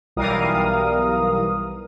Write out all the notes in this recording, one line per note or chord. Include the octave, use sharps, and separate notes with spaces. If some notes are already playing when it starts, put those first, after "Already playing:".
B1 E3 G3 A#4 F5 D#6